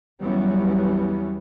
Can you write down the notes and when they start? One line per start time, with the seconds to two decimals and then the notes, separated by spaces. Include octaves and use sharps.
0.22 E2 E3 F#3 G3 B3 C#4